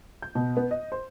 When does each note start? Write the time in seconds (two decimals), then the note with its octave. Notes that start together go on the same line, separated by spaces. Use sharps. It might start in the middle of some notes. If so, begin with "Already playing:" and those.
0.22 G6
0.35 B2
0.57 B3
0.71 D#5
0.92 C5